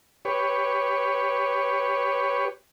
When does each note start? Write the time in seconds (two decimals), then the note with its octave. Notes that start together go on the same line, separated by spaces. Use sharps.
0.25 G4 B4 C#5